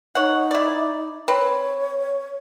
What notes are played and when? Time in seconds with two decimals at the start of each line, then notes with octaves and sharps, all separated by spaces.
0.15 D#4 C#5 F#5
0.51 E4 D5
1.28 C4 B4 C#5